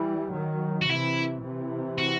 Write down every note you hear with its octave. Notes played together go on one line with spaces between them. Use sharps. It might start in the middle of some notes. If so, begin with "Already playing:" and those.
Already playing: E3 G3
D#3 F#3
F#4
C3 E3 E4
C3 E3
F#4